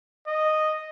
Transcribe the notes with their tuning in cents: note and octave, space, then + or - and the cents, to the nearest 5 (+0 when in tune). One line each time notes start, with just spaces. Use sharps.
D#5 -5